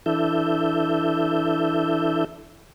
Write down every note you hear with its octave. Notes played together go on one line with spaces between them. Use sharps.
E3 D4 E4 A4 E5 G6